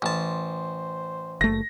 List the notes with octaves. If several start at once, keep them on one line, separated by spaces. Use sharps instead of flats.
A1 C5 A5
F#1 A3 A#6